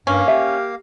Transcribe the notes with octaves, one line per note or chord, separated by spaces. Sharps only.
G2 A#3 C#4 F5
G4 E5